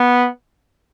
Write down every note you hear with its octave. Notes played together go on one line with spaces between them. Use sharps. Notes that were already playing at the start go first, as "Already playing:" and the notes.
Already playing: B3